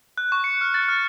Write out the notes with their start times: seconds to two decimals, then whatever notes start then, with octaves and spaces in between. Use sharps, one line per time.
0.18 F#6
0.32 C#6
0.44 C#7
0.61 F6
0.74 A6
0.88 F6